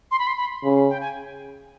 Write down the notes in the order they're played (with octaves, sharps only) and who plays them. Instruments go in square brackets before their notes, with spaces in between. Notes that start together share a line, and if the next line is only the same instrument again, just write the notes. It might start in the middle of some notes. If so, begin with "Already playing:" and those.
[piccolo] C6
B5
C6
B5
[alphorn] C#3
[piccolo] G5
G#5